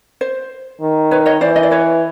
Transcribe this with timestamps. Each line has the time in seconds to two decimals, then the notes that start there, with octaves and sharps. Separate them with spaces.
0.21 C5
0.81 D#3
1.11 B4 C#5
1.26 C#5 D#5
1.41 E3 C5 D5
1.56 D#5
1.63 D5
1.71 B4 C#5